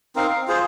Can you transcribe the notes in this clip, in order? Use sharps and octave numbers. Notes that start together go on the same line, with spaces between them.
C4 D#4 A#4 F5
F4 G#4 C5